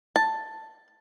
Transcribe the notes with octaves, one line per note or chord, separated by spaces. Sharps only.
A5